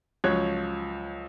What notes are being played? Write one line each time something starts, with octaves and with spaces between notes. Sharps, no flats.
C#2 F3 F#3 C#5 F#6 G#6